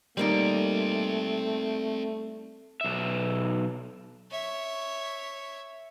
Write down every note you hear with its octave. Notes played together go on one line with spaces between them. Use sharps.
G3 A3 A#3 C4 D#4 D5
B1 E5
C#5 E5